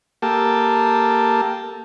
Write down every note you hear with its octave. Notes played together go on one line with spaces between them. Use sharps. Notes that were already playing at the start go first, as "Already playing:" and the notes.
A#3 G4 A4 A5